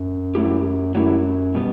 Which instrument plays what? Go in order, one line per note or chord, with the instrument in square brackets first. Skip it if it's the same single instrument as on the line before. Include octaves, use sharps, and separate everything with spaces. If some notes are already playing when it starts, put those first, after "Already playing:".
Already playing: [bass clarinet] F#2
[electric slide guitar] F#3 A3 E4 G4
[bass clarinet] F#2 [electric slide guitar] F#3 A3 E4 G4
[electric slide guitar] B2 G3 B3